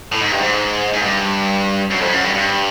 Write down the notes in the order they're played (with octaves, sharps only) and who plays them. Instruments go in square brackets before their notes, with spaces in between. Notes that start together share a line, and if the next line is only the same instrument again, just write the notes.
[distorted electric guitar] A2
G#2
G2
G#2
G#2
G2
F#2
F2
F#2
G2
G2